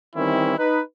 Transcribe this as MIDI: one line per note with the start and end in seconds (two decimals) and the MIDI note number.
0.15 0.56 51
0.15 0.56 52
0.15 0.56 55
0.15 0.56 60
0.15 0.56 61
0.15 0.56 64
0.57 0.80 63
0.57 0.80 71